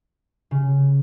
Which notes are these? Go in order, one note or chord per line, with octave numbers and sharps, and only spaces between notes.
C#3